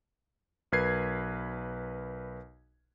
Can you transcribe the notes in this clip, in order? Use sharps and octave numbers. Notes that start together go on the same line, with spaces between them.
B1 A#4 B4 G#6 C7